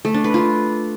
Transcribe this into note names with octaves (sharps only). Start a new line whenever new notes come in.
A3
D4
B4
F4